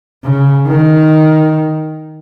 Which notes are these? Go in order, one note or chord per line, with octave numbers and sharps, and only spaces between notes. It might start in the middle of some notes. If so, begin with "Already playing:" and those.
C#3
D#3